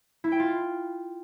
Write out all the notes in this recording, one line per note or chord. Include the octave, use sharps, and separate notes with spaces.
E4
G5
F4